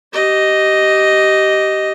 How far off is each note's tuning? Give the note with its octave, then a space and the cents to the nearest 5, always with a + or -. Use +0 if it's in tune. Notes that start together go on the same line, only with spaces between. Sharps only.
G4 -20 D#5 +0